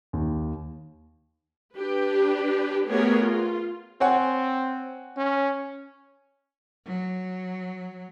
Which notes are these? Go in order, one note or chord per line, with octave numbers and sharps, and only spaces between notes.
D#2
D4 G4 B4
A3 B3 G4 G#4 A#4 C#5
F4
C4 C#5 F#5 G#5
C#4
F#3